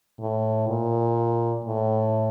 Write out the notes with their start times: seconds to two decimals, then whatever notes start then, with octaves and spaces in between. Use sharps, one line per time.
0.20 A2
0.68 A#2
1.65 A2